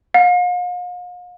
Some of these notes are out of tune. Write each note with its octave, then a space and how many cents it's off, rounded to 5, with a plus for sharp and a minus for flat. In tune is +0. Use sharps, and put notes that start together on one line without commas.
F5 +40